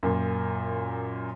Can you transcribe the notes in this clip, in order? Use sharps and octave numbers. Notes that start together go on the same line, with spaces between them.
F#2 A#2